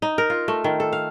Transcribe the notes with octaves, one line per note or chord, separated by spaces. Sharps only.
D#4
A#4
F4
A3
D#3
A4
F5